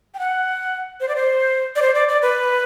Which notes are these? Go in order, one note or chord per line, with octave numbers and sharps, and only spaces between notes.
G5
F#5
C5
D5
C5
D5
C5
D5
D5
B4